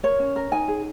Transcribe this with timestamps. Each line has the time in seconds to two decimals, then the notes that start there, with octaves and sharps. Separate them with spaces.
0.03 A#4 C#5
0.20 C#4
0.36 A#4
0.52 D#4 G#5
0.68 G#4